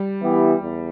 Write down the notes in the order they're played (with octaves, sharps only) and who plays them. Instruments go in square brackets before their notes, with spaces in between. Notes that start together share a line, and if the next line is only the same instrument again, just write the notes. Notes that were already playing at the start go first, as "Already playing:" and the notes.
Already playing: [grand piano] G3
[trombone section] E3 B3 E4 G4
E2